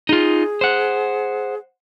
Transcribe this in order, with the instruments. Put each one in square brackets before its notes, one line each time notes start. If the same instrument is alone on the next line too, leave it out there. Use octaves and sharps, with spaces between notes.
[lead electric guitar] D#4 F4 [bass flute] G#4
[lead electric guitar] C5 F#5